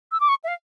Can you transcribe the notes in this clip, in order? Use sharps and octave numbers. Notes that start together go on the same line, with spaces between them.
E6
D6
C#6
E5
F5